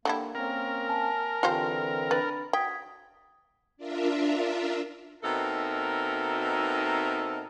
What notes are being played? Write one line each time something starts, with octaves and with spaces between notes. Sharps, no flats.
D3 G3 A#3 E4
A#3 C4 C#4 A#4
G#5 A5
D3 E3 C4 F4 G4 C5
D4 B4 B5 A6
F#4 G5 D#6 G#6 B6
D4 F4 A#4 E5
B2 C4 D#4 A4 A#4 E5